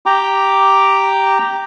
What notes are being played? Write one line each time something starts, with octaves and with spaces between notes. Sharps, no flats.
G4 G5 A#5 D6